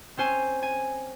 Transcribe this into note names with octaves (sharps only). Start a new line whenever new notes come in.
C4 C#4 C5 G#5
G#5